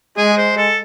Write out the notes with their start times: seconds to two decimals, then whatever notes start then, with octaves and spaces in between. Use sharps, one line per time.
0.17 G#3 G#4
0.38 C5
0.57 A4